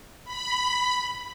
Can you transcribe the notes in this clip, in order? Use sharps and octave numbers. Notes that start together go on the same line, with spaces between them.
B5